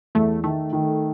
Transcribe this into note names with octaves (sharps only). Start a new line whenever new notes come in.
E2 A3
D#3 A3
D#3